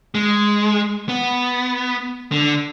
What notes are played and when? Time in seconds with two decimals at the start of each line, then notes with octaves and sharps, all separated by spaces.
0.15 G#3
1.09 B3
2.32 D3